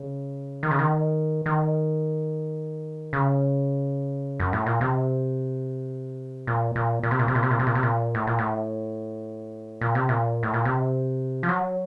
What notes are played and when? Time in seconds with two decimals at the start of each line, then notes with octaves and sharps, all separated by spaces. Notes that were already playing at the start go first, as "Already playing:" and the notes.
Already playing: C#3
0.63 D#3
0.71 C#3
0.79 D#3
1.46 D#3
3.13 C#3
4.40 F#2
4.53 A2
4.66 A#2
4.81 C3
6.47 A#2
6.76 A#2
7.03 A#2
7.11 C3
7.19 A#2
7.28 C3
7.35 A#2
7.43 C3
7.51 A#2
7.59 C3
7.67 A#2
7.75 C3
7.83 A#2
8.15 A2
8.27 A#2
8.39 A2
9.81 A#2
9.95 C3
10.09 A#2
10.43 A2
10.54 A#2
10.65 C3
11.43 F3
11.49 F#3